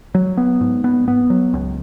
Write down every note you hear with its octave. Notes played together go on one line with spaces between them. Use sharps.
F#3
B3
G#2
B3
B3
F#3
C#2